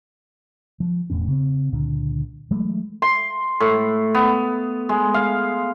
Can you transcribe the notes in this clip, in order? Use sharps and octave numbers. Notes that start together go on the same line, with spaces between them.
F3
E1 E2 A2 C#4
C#3 C4
C#2 A#2 D3
E3 F#3 G#3 A3
C6
A2
B3
G#3
F5